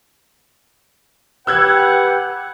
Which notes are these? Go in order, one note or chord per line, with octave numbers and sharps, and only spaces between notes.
G4 B4 F#5 E6 F#6 G#6